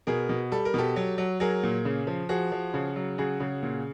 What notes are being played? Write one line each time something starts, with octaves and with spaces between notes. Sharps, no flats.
B2 G#4 A#4
B2
G3 A4
A#4
B2 G4 A4
F#3
F#3
F#3 G#4 A#4
A#2
C#3
F3
F3 F#4 G#4
F3
C#3
F#3
C#3 F#4 G#4
C#3
A#2